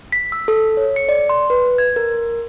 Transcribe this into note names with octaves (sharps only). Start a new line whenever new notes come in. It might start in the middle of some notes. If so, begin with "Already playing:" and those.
B6
E6
A4
C#5
C#7
D5
C6
B4
G#6
A#4